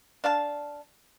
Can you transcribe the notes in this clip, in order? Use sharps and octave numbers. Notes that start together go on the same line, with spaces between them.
D4 F5 A5